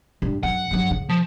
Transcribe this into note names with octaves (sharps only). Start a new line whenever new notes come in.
G2
F#2 F#5
G2 F#3
C#3
F3